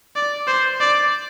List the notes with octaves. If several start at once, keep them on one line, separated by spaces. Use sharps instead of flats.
D5
C5
D5